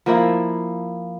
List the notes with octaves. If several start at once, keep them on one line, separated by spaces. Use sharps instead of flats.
F3 A#3 E4